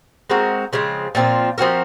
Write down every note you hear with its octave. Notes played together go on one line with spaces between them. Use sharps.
G#3 C4 F#4 A#4
C#3 F3 G#3 C4
A#2 F3 C4 F4
F3 C4 F#4 A#4